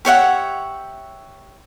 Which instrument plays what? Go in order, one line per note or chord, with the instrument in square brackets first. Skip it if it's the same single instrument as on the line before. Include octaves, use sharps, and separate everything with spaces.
[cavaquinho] G4 C#5 E5 F#5